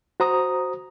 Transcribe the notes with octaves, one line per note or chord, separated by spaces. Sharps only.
F#4 C5 A#5 D#6